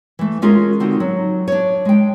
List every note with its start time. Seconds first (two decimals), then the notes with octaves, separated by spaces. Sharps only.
0.19 E3 A3
0.42 G#3 C#4 F4 G#4 A#4
0.80 D3 C4 D#4 F#4
1.00 F#3
1.48 D4 C#5
1.85 G#3 G5